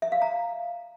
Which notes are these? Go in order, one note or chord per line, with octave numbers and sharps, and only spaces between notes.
E5
F5
A#5